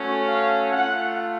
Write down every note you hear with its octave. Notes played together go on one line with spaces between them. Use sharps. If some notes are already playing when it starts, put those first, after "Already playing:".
Already playing: A3 C#4 F#4
F5
A3 F4 F#5